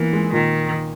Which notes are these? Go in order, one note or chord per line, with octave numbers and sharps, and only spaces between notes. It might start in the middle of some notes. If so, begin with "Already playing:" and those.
Already playing: E3 A#3 B3
G#3
A#2 D#3